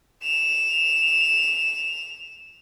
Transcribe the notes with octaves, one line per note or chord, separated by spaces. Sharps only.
E7 F7